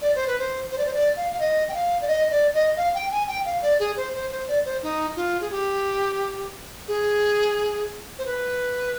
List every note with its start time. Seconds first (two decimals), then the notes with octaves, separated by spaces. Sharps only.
0.02 D5
0.15 C5
0.27 B4
0.39 C5
0.71 C5
0.78 D5
0.86 C5
0.93 D5
1.16 F5
1.32 F5
1.40 D#5
1.69 G5
1.74 F5
2.01 D5
2.07 D#5
2.31 D5
2.54 D#5
2.77 F5
2.94 G5
3.11 G#5
3.27 G5
3.45 F5
3.62 D5
3.79 G#4
3.97 C5
4.14 C5
4.31 C5
4.48 D5
4.65 C5
4.83 D#4
5.16 F4
5.41 G#4
5.51 G4
6.88 G#4
8.18 C5
8.26 B4